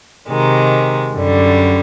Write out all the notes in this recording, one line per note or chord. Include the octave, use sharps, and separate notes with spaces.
C3 D#3 G#3
F#2 D3 G3